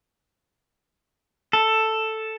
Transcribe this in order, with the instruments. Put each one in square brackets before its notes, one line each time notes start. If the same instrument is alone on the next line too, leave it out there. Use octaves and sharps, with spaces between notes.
[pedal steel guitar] A4